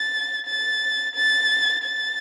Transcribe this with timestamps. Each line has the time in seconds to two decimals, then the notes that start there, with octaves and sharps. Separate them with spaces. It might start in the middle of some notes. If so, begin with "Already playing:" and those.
Already playing: A6
0.47 A6
1.16 A6
1.84 A6